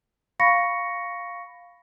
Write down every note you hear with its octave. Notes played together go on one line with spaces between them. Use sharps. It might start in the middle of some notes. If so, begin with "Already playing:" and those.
F5 B5 C#6 A#6 C#7